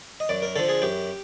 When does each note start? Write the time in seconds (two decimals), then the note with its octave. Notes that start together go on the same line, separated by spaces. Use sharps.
0.20 D#5
0.29 F#2 D5
0.42 A#4
0.56 D3 F3 A4
0.69 G#4
0.82 F#2 G4